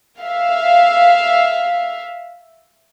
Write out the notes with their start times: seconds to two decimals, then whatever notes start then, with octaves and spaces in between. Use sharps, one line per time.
0.21 E5 F5